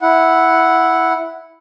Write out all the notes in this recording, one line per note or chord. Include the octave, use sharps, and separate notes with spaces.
E4 F#5